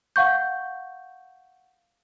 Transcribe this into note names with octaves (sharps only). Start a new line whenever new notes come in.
F5 F#5 C#6 G6